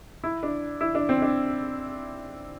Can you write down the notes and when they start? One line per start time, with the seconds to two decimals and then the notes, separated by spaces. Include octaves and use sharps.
0.24 E4
0.43 D4
0.81 E4
0.95 D4
1.09 C4
1.22 D4